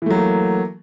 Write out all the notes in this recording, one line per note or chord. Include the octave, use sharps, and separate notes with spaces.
E3 F#3 A3 A#3